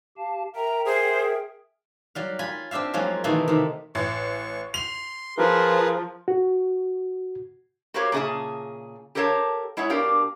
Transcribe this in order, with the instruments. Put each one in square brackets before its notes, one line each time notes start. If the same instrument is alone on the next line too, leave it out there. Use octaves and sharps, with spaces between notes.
[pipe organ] G4 F5 A5
[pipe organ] A#4 E5 G5 [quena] A#5
[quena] G#4 [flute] C5
[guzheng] F#3 G3 F5
F4 G#5 B5
C4 D4 G4 E5 F5
F3 F#3 G#3 A#3 C#4
B2 D#3 E3 A3 A#3 C4
C3 D#3
[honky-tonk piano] A1 [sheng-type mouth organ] C#6
[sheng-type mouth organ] C6 [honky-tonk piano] F7
[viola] F3 [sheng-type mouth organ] G#4 A#4 B4
[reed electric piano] F#4
[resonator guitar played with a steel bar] F#4 G4 A#4 C5 C#5 F5
A#2 C#3 G#4 E5 A5
G4 A4 A#4 C#5 F5 A5
G#3 E4 C#5 E5 F#5
B2 D4 G4 A#4 F5